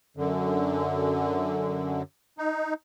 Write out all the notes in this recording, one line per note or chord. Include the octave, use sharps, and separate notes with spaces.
F#2 D3
D#4